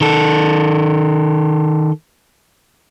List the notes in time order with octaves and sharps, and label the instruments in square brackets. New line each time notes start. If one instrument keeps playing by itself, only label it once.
[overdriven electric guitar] D#3 A4